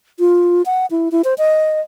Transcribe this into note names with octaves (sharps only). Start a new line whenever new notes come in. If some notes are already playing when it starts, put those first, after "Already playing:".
F4
F#5
E4
E4
C5
D#5